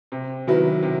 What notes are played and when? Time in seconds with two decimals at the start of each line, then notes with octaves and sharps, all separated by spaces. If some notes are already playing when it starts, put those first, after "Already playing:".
0.12 C3
0.47 D#3 F#3 B3 E4
0.83 C3